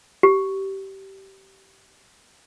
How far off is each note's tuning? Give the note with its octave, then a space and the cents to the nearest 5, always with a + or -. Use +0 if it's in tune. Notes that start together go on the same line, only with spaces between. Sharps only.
G4 -20